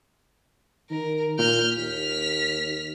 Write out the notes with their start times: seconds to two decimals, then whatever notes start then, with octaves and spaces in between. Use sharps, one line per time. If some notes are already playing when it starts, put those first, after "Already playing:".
0.90 D#3 A#4
1.38 A#2 F6 G6
1.77 D#2 F6 B6